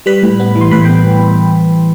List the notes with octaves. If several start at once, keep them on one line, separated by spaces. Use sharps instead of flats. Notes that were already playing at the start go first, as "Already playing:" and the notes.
G3 B4 B5
A2
B3
E3
C6
A2 B4 B5
G5
B3